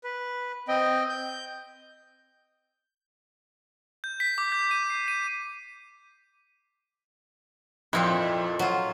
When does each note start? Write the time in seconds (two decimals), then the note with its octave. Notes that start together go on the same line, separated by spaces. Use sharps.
0.04 B4
0.68 C4 D#5 G5
1.09 G6
4.04 G6
4.20 B6
4.38 D6
4.52 G6
4.71 D#7
4.90 C7
5.08 D#7
7.93 F2 A#2 C4 E4
8.59 F#3 F4